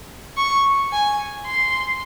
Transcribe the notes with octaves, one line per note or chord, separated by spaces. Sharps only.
C#6
G#5
C6